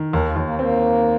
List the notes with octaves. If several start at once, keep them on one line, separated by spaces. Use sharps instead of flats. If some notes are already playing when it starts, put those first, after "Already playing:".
Already playing: D#3
D#2 A#4
F4
D#2
A#3
A#3 C4